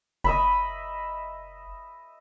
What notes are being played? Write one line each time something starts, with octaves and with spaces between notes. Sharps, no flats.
F#1 D#5 E5 B5